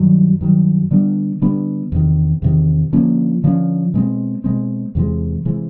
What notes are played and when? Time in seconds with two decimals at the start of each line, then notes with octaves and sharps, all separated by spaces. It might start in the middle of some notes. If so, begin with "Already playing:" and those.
Already playing: G2 D#3 F#3
0.41 G2 D#3 F#3
0.91 D3 G3 B3 D4
1.42 D3 G3 B3 D4
1.92 E2 C3 D#3
2.42 E2 C3 D#3
2.93 D3 F3 A#3 C#4
3.44 D3 F3 A#3 C#4
3.94 B2 G#3 C4
4.44 B2 G#3 C4
4.95 E2 C3 E3 G#3
5.45 C3 E3 G#3